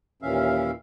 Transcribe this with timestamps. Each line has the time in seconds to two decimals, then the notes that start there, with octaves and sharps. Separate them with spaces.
0.22 D#2 A#2 E3 C#4 E5 F5